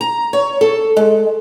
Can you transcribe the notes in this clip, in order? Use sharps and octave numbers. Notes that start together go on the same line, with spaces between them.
A#5
C#5
A4
G#3